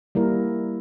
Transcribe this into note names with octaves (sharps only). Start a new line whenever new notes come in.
G3 A#3 E4 A#4